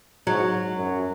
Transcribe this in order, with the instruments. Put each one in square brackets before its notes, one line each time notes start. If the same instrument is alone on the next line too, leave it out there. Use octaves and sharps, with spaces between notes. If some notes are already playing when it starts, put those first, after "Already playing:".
[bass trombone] G#2 [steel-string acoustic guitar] F#3
[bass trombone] F#2